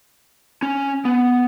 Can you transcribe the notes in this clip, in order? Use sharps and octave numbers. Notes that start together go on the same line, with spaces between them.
C#4
B3